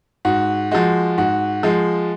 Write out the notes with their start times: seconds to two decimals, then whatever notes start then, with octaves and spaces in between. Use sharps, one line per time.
0.25 G#2 F#4
0.71 F3 G#3 F#4
1.18 G#2 F#4
1.63 F3 G#3